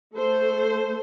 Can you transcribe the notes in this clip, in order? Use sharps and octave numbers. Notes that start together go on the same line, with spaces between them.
A3 A4 C5